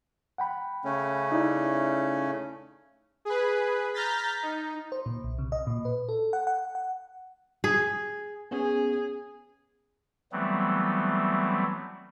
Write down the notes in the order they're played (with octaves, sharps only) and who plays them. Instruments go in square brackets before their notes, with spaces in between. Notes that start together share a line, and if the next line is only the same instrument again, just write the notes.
[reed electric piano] F#5 G5 B5
[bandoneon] C#3 A3 C#4
[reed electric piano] D#4 E4 D5
[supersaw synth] G#4 B4
A#5 F6 G6 A6 B6
D#4
[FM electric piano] C5
A#2
B1
C3
D#5
A#2
B4
A4
F#5
F#5
F#5
[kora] G#4
[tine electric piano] B3 C#4 [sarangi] G#4
[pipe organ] E3 F#3 G3 A3 B3 C4